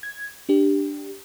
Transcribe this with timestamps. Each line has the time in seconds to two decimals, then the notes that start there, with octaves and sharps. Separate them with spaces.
0.03 G#6
0.49 D4 G4